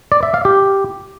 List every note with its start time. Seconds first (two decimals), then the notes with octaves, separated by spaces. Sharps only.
0.12 D5
0.23 E5
0.34 F5
0.45 G4